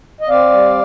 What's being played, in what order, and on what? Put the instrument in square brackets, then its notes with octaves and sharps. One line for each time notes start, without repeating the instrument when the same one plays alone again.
[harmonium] D#5
C4 D5 F5
G3